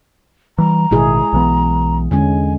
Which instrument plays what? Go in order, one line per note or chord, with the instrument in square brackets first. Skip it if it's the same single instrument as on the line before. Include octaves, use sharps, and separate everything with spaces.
[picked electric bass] E3 G3 [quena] A#5
[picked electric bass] A1 B2 D#3 [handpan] G#3 E4 G#4
[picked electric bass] B1 E3 B3
[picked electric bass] E2 [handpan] D3 G#3 C#4 [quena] G#5